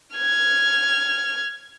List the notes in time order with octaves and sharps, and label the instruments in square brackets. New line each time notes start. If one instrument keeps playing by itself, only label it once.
[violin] F6 G#6